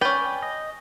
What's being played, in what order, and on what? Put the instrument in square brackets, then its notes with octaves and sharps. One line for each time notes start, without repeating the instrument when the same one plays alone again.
[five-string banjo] C#4 B4 [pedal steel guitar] D5 G5
[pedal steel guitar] D#5